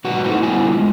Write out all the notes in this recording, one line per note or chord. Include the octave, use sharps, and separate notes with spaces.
G#2 F#3 F#4 B4 F#5
A3 D#4 E4 C5
D3 G3 B3 E4 F4 G#5
G#3